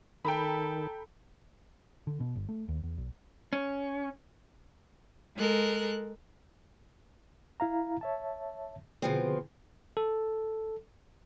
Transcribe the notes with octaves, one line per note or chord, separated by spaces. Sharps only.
D#3 A4 G5 A#5 B5
D3
B2
G1
A3
D#2
E2
B1
C#4
G#3 A4 A#4 F#6
E4 F5 A#5
C#5 E5 A5
B2 D3 F3 C4 G#4
A4